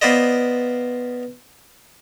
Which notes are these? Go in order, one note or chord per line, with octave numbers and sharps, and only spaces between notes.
B3 F4 B4 C5 D5 D#5